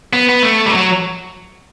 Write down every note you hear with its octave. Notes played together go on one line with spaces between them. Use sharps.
B3
B3
A3
G3
F#3